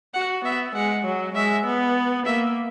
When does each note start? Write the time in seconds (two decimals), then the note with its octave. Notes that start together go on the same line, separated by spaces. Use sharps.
0.14 F#4 F#5
0.44 B3 E5
0.75 G#3 F#5
1.05 F#3
1.35 G#3 E5
1.65 B3
2.26 A#3 E5